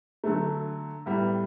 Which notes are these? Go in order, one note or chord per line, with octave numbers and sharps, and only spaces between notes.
D3 F#3 A3
A2 G3 B3